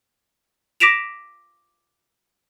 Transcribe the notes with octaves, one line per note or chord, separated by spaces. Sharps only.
D6 A#6 B6 D7 E7 F7